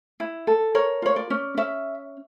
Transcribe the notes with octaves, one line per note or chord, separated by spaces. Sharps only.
E4
A4
A#4 C#5
F4 C#5
D5
C#4
C#4 E5